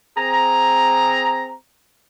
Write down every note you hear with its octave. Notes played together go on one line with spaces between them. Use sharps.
C4 G#4 A#5